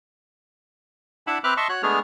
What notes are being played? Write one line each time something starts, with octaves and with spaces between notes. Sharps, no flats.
D4 E4 E5 F#5 A5 B5
C4 B4 E5 D6 F6 F#6
D#5 E5 A5 C6 C#6
F#4 C#5 F#6
G#3 A3 B3 D4 G#4 F6